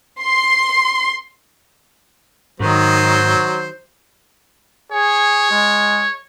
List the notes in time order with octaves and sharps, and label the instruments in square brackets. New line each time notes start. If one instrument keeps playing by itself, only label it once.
[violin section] C6
[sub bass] G#2 [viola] D#3 [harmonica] F#3 C5
[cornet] G#4 [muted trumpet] C#5
[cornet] G#3